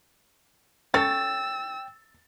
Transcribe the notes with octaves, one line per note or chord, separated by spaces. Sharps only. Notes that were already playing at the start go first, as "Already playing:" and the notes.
C#4 A4 C#5 G5 E6 A6